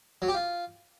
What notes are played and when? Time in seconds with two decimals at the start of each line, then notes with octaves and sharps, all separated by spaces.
0.22 F#3
0.28 G4
0.34 F4